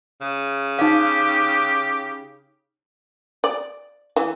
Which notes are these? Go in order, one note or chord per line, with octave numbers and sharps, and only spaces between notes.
C#3
D#4 G4 F5
D5
E3